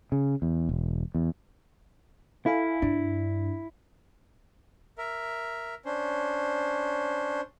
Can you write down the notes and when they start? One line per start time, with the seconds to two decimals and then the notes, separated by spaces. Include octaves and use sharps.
0.12 C#3
0.42 E2
0.69 E1
1.15 E2
2.46 E4 A4 F5 G#5
2.82 G2 D4
4.98 A#4 E5
5.85 C#4 D4 C5